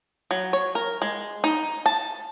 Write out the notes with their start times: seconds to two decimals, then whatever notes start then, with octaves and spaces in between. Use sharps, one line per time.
0.31 F#3
0.53 C#5
0.75 A#4
1.02 G#3
1.44 D#4
1.86 A5